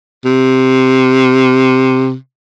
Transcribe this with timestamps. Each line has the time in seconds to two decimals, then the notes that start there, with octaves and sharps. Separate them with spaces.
0.25 C3